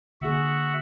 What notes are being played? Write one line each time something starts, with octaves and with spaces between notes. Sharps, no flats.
D3 A#3 F#4 G#4 E5 F#5